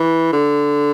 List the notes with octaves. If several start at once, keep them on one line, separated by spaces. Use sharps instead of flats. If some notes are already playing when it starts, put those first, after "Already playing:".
Already playing: E3
D3